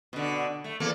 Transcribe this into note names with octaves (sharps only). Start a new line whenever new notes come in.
B2 D3
A3
E2 A#3 A4